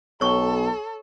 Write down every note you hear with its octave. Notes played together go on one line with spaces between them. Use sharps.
B1 A4 C#5 C#6